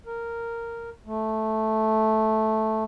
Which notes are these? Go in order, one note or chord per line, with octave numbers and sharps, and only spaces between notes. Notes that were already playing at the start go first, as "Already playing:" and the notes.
A#4
A3